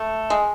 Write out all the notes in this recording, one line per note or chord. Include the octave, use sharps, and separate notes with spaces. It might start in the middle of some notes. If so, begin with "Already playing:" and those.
Already playing: A3
G#3